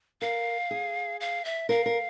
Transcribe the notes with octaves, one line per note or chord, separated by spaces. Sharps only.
A#4 F5
G#4
F5
E5
A#4 F5
A#4